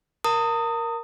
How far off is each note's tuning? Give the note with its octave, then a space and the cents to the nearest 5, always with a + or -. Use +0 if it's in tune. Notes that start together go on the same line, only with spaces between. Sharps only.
A#4 +5 A#5 -45 D#6 +0